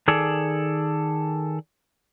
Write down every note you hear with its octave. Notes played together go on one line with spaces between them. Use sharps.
D#3 G#4 A4 D5